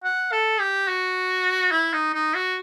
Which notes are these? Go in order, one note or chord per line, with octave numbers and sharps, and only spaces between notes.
F#5
A4
G4
F#4
E4
D#4
D#4
F#4